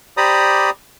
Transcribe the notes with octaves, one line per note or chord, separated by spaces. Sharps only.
G4 C5 D5 A#5 B5 D#6